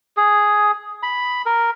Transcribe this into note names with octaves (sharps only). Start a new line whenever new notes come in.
G#4
B5
A#4